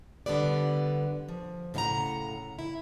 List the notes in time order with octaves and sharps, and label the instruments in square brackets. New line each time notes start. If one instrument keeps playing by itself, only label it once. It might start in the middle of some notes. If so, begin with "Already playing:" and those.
[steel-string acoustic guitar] D3 G3 B3 B4 D5
F3
A2 C#3 C5 F5 F#5 A#5
E4